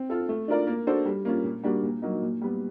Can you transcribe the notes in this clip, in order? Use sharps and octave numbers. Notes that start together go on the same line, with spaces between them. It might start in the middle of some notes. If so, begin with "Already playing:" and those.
Already playing: C4
F4 A4
A3
D4 F4 A#4 D5
A#3
D4 F#4 A4 C5
G3
A#3 C#4 F4
A#2
G3 A#3 D4 F#4
A#2
F#3 A#3 D#4
A#2
G3 B3